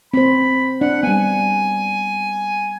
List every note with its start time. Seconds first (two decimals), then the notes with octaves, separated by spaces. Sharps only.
0.14 C4 C5 B5
0.81 D4 F#5
1.03 G3 B3 G#5